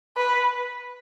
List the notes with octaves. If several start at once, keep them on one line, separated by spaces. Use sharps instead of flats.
B4